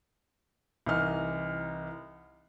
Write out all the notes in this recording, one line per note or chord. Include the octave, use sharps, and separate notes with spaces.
C2 E3 D#4 F6